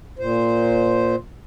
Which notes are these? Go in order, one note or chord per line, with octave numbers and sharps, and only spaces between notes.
A#2 C5